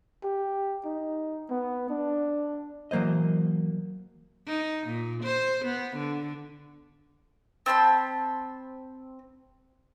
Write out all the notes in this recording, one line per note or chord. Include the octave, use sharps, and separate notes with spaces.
G4
D#4
B3
D4
E3 F#3 A#3 C5 D#5
D#4
A#2
C5
B3
D3
C4 A5 B5 C6